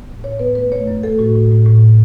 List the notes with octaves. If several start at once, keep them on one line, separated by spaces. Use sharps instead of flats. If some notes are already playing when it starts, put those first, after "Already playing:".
Already playing: B3
A2
A2 C#5
B3 B4
A3 B4
A3 C#5
F#2 C#5
A3 A4
A2 F#4
A2
A2
A2